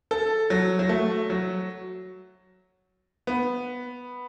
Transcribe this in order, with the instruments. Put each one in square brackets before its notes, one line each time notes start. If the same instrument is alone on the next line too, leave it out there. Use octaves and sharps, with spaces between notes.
[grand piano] A4
F#3
F#3
A3
F#3
B3